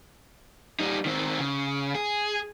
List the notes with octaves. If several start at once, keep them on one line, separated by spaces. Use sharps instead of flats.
G3 D#4
D#3 C4
C#3
G#4